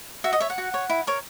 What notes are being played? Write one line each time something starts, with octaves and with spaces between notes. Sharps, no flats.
F#4 E5
D#5
C#5 E5
F#5
F#4
C#5
E4
A#4 C#5